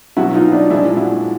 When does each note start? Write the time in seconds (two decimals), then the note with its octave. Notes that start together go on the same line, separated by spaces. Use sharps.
0.17 B2 F#3 E4 F#4
0.34 D#4 F4
0.52 D4 E4
0.70 A#2 F3 G#3 D4 E4
0.97 E4 F#4